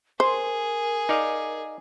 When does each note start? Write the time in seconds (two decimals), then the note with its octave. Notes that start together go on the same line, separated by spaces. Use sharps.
0.20 G#4 A#4 C5
1.09 D#4 D5 F5